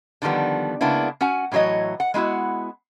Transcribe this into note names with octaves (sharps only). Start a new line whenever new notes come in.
D3 D#3 F3 G3 B3
C#3 G#3 A#3 B3 D4 E4
C#4 F#4 F#5 G#5
A2 E3 F#3 C#5 D#5
F#5
G#3 B3 E4 F#4